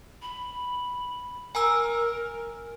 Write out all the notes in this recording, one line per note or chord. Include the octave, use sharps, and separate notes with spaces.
B5
A#4 G#5 A#5 E6